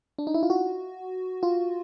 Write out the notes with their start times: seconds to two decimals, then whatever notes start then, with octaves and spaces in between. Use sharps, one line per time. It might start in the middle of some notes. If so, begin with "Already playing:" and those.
0.18 D4
0.27 D#4
0.34 E4
0.43 F4
0.50 F#4
1.43 F4